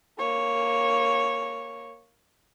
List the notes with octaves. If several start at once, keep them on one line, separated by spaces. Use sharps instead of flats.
A#3 C#5